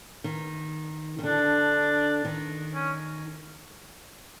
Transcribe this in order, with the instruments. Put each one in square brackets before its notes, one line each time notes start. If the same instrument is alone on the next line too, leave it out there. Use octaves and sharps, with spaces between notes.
[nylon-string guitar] D#3
D#3
[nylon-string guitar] D3 [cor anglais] D4
[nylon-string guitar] D#3
[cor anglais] C#4